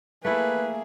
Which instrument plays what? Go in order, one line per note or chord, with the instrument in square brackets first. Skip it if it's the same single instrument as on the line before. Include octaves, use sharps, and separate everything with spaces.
[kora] A3 E4 [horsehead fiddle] A#3 G#4 [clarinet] B4